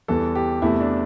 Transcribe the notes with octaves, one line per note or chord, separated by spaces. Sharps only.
E2 E3 G3 A4
G4
E2 C3 A3 E4
D4